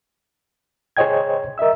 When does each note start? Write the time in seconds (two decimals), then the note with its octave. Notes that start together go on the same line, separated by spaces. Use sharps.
0.97 G#4 C5 C#5 D#5 G5 G#6
1.58 A#4 D#5 E5 E6